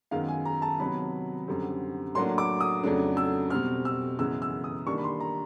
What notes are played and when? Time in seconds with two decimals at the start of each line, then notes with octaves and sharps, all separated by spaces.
0.11 F#2 D#3 G#3 B3 F5
0.28 G#5
0.45 A#5
0.62 A5
0.79 C3 D#3 F#3 B3 B5
1.48 F#2 D3 G3 C4
2.15 A2 F#3 A#3 D4 C6
2.38 D6
2.60 D#6
2.83 F2 C#3 F#3 A3 D4
3.17 E6
3.50 B2 G3 C4 F6
3.85 E6
4.19 F#2 C#3 E3 G#3 B3 E6
4.42 E6
4.64 D#6
4.86 D#3 G3 A#3 D4 C#6
4.98 B5
5.04 C6
5.20 A#5